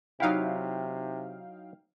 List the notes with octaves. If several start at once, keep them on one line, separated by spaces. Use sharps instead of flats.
C3 F#3 D#4 E4 F5 G5